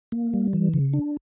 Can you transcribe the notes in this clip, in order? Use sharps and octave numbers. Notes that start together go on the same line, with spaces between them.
A#3
G3
E3
C#3
D4